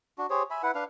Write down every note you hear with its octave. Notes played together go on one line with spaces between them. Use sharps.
D4 F#4
G4 G#4 C5 C#5
E5 G#5 B5
E4 B4 F#5
D4 B4 F5